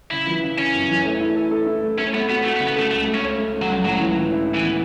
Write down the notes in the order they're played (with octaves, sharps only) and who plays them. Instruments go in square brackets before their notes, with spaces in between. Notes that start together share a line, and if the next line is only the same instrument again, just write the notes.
[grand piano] C#3 [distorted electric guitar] E4
[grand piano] E3
C#3
[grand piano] C#3 [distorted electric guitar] C#4
[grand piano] F#2
E3
A3
E4
A4
A4
E4
A3
[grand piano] A3 [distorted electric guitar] C#4
[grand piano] A3 [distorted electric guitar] B3
[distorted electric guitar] B3 [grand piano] F#4
[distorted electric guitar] A3 [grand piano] F#4
[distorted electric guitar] B3
[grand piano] C#3
[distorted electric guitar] B3
[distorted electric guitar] A3 [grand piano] A4
[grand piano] C#2 [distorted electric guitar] A3
[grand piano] A3
[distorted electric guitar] C#4
[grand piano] C#2
A3
C#2
[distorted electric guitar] F#3
[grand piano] C#2
[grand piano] A2 [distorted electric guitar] F#3
[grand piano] E3
E3
E4
E4
[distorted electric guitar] E3
[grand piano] B3